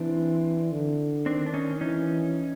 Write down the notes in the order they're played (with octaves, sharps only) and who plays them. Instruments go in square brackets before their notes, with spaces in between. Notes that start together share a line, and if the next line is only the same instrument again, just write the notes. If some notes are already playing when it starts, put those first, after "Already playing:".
Already playing: [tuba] E3 [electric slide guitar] C4 D4
[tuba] D3
[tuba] D#3 [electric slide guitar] C4 D4
[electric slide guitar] D4
C#4 D#4
[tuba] E3 [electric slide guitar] C#4 D#4